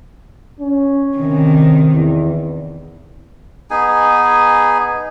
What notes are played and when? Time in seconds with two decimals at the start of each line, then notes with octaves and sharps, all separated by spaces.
0.60 C#4
1.17 C3 D#3
1.93 E2
3.70 B3 D#4 G#4 G#5